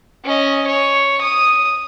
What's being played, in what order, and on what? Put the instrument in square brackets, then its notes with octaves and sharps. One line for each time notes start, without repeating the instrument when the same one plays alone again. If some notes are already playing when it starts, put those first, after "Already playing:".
[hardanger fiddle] C#4 D#5
C#5
D#6